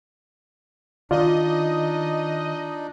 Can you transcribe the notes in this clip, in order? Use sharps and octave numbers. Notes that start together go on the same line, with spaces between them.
D#3 D4 D#4 F4 D5 D#5